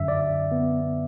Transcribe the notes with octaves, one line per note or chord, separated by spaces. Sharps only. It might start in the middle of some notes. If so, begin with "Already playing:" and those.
Already playing: F#2 D3 E5
D5
B3